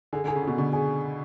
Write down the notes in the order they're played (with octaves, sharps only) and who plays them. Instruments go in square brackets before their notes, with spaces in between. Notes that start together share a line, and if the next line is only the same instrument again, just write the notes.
[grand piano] D3 [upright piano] G#4
[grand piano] D3
[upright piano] G#4
[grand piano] C#3
[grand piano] B2 [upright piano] G#4
[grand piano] B2 [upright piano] D3
[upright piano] G#4